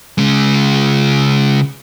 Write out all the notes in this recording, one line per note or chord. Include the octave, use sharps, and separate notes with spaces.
C#3 G#3